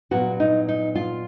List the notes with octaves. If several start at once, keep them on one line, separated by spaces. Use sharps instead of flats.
A#2 F#3 B3 F#4
D#4
D#4
F4